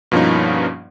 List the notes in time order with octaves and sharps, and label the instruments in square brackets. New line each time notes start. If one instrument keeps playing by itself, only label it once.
[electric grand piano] G2 B2 F3 A#3 C#4 D#4